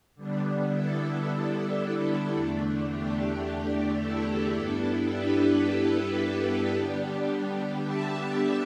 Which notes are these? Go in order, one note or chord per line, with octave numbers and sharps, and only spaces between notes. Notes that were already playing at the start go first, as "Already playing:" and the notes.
D3 G3 B3 D4
E4 A4
E4 A4
E2 D3 A3 D4
G4
E4 A4
G2 G3 B3 D4
G4 B4
E4 A4
D3 G3 B3 D4 G4
G4
E5 A5